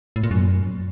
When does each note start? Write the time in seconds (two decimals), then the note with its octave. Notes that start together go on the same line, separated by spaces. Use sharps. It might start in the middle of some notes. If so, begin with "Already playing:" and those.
0.16 A2
0.23 A#2
0.31 F#2